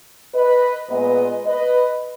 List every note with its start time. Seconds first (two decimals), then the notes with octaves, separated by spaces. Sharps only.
0.34 B4 D#5
0.89 A#2 G#3 B3 B4 D#5
1.46 B4 D#5